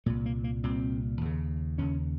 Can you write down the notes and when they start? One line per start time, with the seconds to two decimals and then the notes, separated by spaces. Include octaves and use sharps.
0.06 C2 A#2 A3
0.26 A#3
0.44 A#3
0.64 C2 A#2 C4
1.21 D#2 C#3
1.78 D#2 C#3 C#4